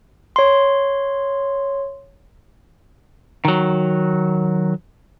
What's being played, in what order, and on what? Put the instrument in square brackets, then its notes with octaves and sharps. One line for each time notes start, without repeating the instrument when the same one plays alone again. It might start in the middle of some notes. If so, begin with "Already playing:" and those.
[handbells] C#5 C6
[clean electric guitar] D#3 F#3